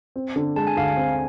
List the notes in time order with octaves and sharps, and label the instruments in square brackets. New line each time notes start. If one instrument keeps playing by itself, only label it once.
[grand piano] C4
D3
[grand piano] G#3 [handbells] A5
[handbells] G#5
[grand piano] D2 [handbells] F5
[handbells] G#5
[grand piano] C4